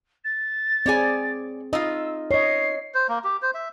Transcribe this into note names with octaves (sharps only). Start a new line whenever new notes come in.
A6
C4 G#4 C#5 D5 G#5
D#4 F4 D#5 E6
C#5 D#5 C7
C5
A#3
G4
C5
E5